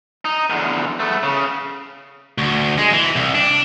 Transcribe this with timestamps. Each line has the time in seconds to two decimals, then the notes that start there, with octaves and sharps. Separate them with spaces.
0.25 D#4
0.50 E2 D3
1.00 A3 B3
1.23 C#3
2.38 D2
2.78 G#3
2.94 E3
3.16 C2
3.35 D4